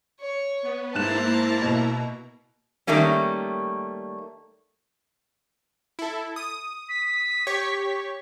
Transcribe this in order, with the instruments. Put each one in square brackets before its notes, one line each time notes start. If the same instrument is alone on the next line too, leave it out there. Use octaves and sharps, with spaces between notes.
[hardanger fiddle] C#5
[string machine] B3
[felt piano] G#2 F#6 E7 [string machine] A#3 E4 A#5 [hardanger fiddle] C5 A5
[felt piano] B2
[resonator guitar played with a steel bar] D#3 G3 A3 A#3 C#4
[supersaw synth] E4 A4
D#6
[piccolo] B6
[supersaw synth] G4 C#5 C#6